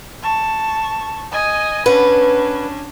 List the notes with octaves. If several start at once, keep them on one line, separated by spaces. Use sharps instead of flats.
A5 C#6
D#5 G#5
C#4 D4 B4 F#5